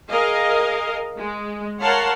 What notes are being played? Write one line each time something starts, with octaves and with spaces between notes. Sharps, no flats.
G#4 A#4 D#5 F5
G#3
A#4 C#5 F5 F#5 A5 C6